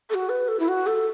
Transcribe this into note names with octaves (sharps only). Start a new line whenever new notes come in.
A4
F#4
B4
A4
E4
F#4
A4